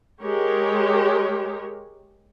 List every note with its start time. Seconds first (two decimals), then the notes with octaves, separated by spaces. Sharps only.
0.22 G#3 G4 G#4 A#4 C#5